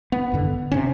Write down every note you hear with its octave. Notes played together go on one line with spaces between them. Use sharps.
B3
A1 G2 D3
C3 C#4